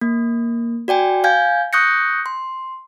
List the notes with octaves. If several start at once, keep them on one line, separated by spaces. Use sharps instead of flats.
A#3
F#4 D5 G5 G#5
F5 G#5 G6 G#6
C#6 D#6 F#6 G6 A#6 C#7
C6